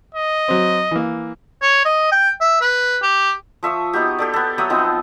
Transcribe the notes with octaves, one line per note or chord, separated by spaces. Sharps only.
D#5
F#3 C4
E3 A#3
C#5
D#5
G5
E5
B4
G4
F3 E5 C#6 D#6
B3 D#4 F#4 G4
G4 A4 D5
B3 A4
F#3 C#5 E5 D#6
F3 B3 C4 D#4